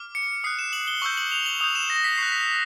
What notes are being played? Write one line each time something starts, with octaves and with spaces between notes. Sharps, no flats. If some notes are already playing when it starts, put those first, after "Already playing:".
Already playing: D6 F6
C#7
D#6 F#6 C7
E7
F#7
G7
C#6 E6 G6 F#7
F#7
F7
F#7
D#6 G6 F7
E7
A#6
B6
C#6 F#6 C7
B6